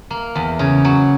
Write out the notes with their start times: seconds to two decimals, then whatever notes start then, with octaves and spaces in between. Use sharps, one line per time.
0.11 A#3
0.35 E2
0.59 C#3
0.85 F#3